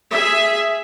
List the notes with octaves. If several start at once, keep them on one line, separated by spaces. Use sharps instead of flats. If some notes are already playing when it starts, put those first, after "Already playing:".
G#4 E5